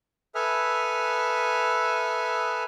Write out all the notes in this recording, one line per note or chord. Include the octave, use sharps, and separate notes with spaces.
A4 B4 E5 G#5 D#6 F6